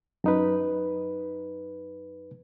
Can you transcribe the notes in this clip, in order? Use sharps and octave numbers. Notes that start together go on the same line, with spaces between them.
F#2 D#4 B4